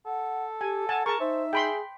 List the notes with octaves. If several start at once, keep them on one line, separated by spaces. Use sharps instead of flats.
A4 F#5
G4 G#5
F#5 G#5 A5
G#4 A#4 A5 C#6
D#4 C5 E5
G#4 G5 B5 C6